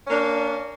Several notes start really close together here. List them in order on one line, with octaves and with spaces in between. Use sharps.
C#4 A#3 D4